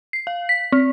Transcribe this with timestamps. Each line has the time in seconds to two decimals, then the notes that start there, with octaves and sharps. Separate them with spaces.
0.13 C7
0.27 F5
0.49 B6
0.72 C4